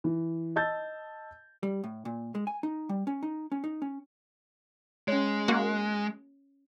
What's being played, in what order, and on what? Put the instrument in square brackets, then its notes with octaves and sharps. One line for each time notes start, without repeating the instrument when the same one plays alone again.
[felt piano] E3
D#5 A5 E6 G6 A6
[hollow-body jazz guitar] G3
A2
A#2
G#3
G#5
D#4
G3
C#4
D#4
C#4
D#4
C#4
[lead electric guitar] G#3 [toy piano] C#4 C#5
[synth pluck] A#3 F#4 F#5